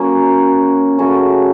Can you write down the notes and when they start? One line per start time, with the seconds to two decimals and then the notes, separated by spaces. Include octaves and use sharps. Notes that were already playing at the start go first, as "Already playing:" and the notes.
Already playing: F#3 A#3 C#4
0.98 C#3 A3 C#4 F#4